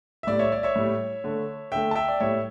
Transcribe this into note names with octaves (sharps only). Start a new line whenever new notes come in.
E5
A2 G3 D5
C#5 E5
D5
C#5 E5
A2 G3
D3 A3
D3 A3 E5 G5
A5
E5 G5
D5
A2 G3 C#5 E5